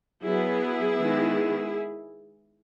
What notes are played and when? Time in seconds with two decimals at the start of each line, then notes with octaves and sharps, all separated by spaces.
0.24 F#3 B3 E4 G#4
0.96 D#3 G#3 B3